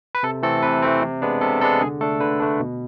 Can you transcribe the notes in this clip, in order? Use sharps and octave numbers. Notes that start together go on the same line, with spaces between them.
B4
C3 A4
E3 A3 C4 A4
C3 B4
E3 A3 C4
C3
G#3 B3 D4
C3 A4
G#3 B3 D4 A4
D3 G#4
A3 D4 A4
D3 B4
A3 D4
B2